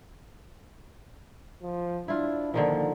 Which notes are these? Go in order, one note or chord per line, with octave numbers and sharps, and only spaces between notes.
F3
D4 E4 F4
A#2 D3 D#3 F3